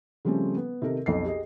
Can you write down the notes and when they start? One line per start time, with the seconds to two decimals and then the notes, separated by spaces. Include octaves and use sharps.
0.25 C#3 F3 G3 A3 C4 C#4
0.57 B3
0.82 C3 D#3 A4 A#4
1.06 B1 F2 C7
1.25 G4 G#4 D#5